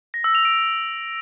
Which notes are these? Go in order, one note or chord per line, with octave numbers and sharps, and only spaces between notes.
A#6
E6
F7
D7